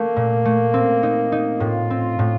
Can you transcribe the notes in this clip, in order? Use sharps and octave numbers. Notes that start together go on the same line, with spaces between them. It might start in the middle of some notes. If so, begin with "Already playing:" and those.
Already playing: A3 A#3
A#2
A3
C4
D#4
D#4
A2 F4
C4
A2